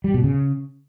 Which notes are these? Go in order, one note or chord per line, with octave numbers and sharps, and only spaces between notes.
G3
B2
C#3